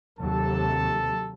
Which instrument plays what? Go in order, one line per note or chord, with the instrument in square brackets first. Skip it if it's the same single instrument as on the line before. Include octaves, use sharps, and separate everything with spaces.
[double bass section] D#2 C3 F#3 [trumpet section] A4 A5